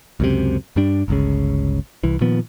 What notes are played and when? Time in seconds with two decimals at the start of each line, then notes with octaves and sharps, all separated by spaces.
0.20 C#2 F#2 C3
0.76 G2 G3 D4
1.08 G1 C#2 C#3
2.04 C2 E3
2.21 A#2 D#3 F3 B3